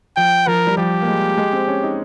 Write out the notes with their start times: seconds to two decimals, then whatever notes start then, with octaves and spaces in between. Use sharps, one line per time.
0.16 F3 G5
0.47 F3 A#4
0.67 G3
0.77 F3 G4
1.02 A#3
1.08 G#3
1.38 G#3
1.53 C4
1.68 C#4
1.83 D#4